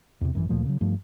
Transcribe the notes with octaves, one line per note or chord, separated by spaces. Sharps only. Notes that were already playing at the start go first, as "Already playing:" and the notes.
E2 C3
G#1 F#2 C#3 E3
D2 A#2 F3 A3
C#3 F#3
G2 F3 A3